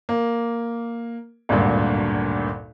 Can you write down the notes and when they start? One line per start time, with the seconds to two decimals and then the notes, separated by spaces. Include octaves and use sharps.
0.09 A#3
1.49 G#1 D2 G2 A#2